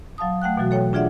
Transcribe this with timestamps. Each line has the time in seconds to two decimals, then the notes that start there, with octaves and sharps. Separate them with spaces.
0.18 F#3 F5 A5 D#6
0.42 A3 F#5 G5 F#6
0.57 B2 E3 F#3 F#4
0.71 A4 C#5 G5
0.93 D4 F4 G#4 D5 E5 F#5